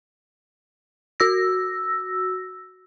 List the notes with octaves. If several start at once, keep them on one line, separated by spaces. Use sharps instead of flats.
F#4 E6 A#6